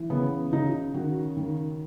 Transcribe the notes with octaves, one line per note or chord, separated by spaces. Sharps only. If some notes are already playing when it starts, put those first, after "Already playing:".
Already playing: E3
C#3 B3
C#3 D#4
D#3 F#4
D#3